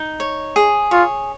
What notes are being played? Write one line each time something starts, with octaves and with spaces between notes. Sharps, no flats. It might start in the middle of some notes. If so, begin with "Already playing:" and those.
Already playing: D#4
C#5
G#4
F4 C#5